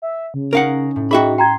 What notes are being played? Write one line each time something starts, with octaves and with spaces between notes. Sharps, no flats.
E5
C#3
C#4 D#4 A#4 F5 F#5
A2
D#4 F#4 G#4 E5 G5 B5
G5 A#5 C6 G#6